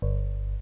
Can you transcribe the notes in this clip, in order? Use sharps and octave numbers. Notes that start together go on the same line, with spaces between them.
G1